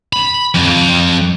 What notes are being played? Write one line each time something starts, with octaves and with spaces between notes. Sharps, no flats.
B5
F2